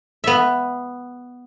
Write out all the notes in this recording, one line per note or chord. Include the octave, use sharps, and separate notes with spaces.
B3 E5